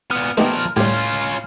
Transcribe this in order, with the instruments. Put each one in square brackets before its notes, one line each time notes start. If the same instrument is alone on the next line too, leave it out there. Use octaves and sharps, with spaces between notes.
[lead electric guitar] A#2 B3 [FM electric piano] F6
[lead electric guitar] F3 A#4 [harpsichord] A3 D#4 [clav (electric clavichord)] B3 G4 G5
[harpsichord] C2 G4 [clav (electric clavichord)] A2 [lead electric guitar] C#4 F4